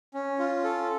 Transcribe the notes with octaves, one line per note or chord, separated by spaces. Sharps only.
C#4
F4
A4